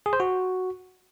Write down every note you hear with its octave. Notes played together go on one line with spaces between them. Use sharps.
G#4
C5
F#4